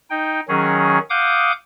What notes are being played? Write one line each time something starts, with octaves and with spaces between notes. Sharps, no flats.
D#4 G5
D#3 F#3 C#4 G#4
F5 F#5 D6 D#6 G6